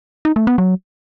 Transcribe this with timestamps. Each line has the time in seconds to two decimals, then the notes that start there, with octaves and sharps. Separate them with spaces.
0.25 D#4
0.36 A3
0.47 B3
0.58 F#3